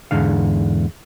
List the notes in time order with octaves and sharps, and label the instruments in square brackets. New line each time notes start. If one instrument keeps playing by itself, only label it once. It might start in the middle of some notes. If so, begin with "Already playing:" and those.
[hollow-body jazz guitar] E2 G#2 D3 F5